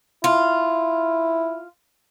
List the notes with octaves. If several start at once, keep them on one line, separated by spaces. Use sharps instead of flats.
E4 F4